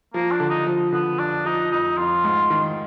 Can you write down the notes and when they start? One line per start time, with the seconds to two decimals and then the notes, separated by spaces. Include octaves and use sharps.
0.14 F3 A#3
0.32 D4
0.40 D3
0.50 D#4
0.66 F3
0.93 D3 B3
1.19 F2 D4
1.45 F3 D#4
1.72 F2 D#4
1.98 F2 F4
2.24 G#2
2.50 D#3